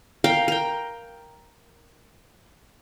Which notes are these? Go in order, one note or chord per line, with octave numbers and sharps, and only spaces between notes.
A#4 F5 G5
A#4 G5